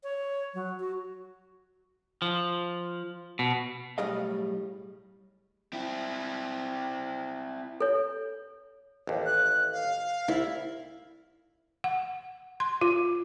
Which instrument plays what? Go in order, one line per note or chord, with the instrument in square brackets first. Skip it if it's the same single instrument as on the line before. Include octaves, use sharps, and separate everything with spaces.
[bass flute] C#5
F#3
F#4
[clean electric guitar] F3
B2
[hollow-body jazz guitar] B1 A2 G3 G#4 D#5 F5
[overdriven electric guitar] C4 E4
[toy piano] A4 C#5
[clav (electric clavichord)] A1 D#2
[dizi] F#6
F5
[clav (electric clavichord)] C2 [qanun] E4
[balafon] F#5
C6
F4